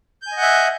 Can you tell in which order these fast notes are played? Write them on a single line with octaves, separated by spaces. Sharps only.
G6 G#5 D#5 F#5 E5